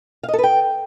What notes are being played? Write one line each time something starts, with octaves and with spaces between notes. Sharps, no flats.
F5
D#5
A4
B4
G5